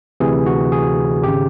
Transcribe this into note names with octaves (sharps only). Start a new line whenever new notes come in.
D2 C3 E3 G#4
F#4
G#4
G#1 C#3 G4